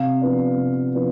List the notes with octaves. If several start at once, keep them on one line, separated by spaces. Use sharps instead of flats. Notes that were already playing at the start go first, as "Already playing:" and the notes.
Already playing: C3 F5
F3 B3 D4
C3
F3 B3 D4